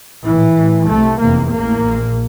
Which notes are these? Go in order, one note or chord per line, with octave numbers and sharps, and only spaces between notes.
A#1 A2 E3
A1 A2
C2 C3 A3
F1 E2 C3 A#3
A1 A2 A#3
A#1 A#2